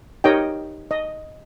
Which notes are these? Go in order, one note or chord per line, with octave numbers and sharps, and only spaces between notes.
D#4 G4 A#4 C#5 D#5 G5
D#5